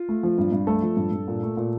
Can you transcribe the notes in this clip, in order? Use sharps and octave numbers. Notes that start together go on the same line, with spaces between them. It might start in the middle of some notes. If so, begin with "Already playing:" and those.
Already playing: F4
A3
F3
G2
G2
A3 A4
F3
G2
G2
A#2
A3
A#2